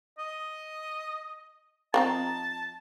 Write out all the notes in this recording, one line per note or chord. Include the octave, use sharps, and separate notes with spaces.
D#5
F3 C4 D#4 A5